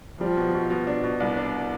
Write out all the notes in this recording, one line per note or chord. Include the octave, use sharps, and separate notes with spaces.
F3 G3
B2
B2
B2
D4
B2
C2
D4